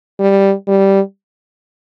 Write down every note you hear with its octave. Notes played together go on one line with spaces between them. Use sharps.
G3
G3